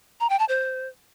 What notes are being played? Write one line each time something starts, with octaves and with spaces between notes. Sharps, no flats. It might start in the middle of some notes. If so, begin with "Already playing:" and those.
A#5
G5
A5
C5